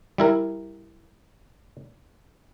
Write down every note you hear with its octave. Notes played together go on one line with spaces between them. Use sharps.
G3 E4 A#4